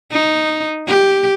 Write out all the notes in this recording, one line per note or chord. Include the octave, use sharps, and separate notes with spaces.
D#4
G4